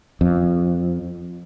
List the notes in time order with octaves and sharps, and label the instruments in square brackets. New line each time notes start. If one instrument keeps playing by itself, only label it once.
[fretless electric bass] F2